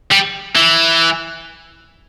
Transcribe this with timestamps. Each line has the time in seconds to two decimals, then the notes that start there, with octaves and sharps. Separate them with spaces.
0.11 G3
0.55 E3